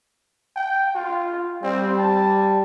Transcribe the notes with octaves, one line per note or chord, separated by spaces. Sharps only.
G5
F4
G3 C4
A5